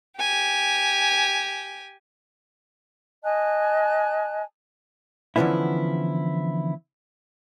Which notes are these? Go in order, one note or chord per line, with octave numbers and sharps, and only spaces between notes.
G4 G#5
D#5 G#5 A5 F#6
D3 E3 F3 B3 C#4 E4